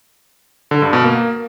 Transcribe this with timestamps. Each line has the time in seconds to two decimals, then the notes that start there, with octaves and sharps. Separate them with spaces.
0.71 D3
0.82 G2
0.93 B2
1.04 A#3